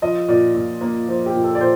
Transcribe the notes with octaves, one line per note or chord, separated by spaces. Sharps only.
F3 D#5
A#2 D5
A#2
A#3
F3 C5
G4
A#2
A4
D5
A#2 C5